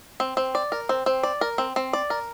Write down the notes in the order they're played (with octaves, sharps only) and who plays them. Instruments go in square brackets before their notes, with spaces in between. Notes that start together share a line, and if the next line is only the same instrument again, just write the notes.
[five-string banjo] C4
C4
D5
A#4
C4
C4
D5
A#4
C4
C4
D5
A#4